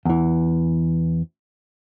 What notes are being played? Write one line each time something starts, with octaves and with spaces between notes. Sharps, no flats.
E2 E3